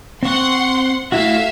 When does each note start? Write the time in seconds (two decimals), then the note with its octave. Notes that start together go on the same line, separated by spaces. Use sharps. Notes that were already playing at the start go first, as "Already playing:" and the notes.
0.23 C4 F#5 C6 C#6
1.12 A3 E4 F#4 E5 F5